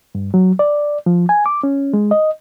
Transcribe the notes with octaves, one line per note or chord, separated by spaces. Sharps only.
G2
F#3
D5
F3
G#5
D6
C#4
G#3
D#5